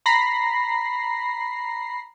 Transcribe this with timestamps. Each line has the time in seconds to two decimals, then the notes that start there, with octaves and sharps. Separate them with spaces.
0.06 A#5 B5 A#6 C7